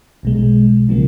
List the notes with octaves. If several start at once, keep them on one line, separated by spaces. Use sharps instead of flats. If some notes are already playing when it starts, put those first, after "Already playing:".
B1 B2 G#3
C#3 F3 A#3